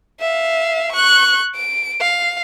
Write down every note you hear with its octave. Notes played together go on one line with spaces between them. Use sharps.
E5 F5
C#6 F#6
D7
F5